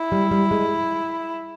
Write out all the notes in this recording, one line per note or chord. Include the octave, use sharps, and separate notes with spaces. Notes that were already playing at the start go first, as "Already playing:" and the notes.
Already playing: E4
G3
G3
G#3